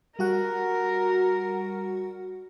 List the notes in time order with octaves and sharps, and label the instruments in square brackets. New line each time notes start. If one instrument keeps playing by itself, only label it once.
[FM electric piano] G3 F#4 F#5 [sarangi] A#4